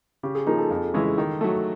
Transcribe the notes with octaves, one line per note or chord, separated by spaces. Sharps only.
C#3 G4
G#4
F3 A#3 D#4 G#4
A4
F2
C#3 E3 G#3
D#3
F#3 A3